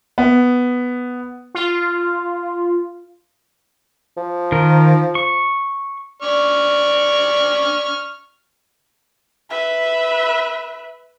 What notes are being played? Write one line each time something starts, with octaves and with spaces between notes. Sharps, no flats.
B3
F4
F3
D#3 A#4
C#6
D5 C#6 F6
B4 E5